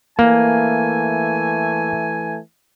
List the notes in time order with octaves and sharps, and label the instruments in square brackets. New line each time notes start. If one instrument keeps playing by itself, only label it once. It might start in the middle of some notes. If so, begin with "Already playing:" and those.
[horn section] E3 A3 G#5 [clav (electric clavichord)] A#3